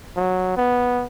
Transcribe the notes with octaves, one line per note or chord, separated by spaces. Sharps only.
F#3
B3